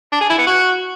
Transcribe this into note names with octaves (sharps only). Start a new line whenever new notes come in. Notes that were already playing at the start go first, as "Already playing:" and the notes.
D4
G#4
E4
B3
F#4